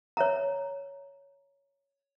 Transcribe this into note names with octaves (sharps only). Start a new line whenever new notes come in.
C#5 E5 A#5